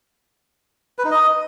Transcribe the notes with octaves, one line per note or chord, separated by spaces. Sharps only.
B4
D#4
D#5